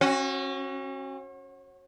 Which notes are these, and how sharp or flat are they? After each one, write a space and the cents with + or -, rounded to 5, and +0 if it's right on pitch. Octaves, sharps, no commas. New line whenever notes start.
C#4 -40 F#4 +0